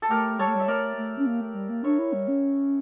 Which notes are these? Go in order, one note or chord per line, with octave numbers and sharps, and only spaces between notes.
A4
A3 G4 A#4
G3 A4 C#5
A3
G3 E5
A3 A#4 D5
A3
C#4
A#3
A3
G3
A#3
D4 C#5 E5
E4
G3
C#4